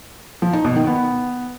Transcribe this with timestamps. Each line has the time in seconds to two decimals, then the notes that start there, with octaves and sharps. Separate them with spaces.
0.42 F3
0.53 D#4
0.65 B2
0.76 D#3
0.87 B3